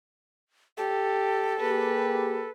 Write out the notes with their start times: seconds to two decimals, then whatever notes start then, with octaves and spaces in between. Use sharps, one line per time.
0.77 G4 A4
1.60 A#3 G4 G#4 B4